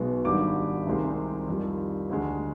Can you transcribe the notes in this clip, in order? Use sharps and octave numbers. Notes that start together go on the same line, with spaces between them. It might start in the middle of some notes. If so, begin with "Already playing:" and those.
Already playing: B1 B2 G#3 B3
G#1 G#2 D#3 G3 D4 D6
C2 C3 D#3 G#3 C4
F2 D#3 G3
D2 D3 G#3